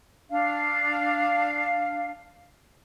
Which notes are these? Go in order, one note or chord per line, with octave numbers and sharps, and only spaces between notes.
D4 F5